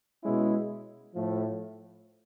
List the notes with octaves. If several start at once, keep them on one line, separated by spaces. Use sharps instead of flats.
B2 G#3 C#4 E4
A2 F3 A3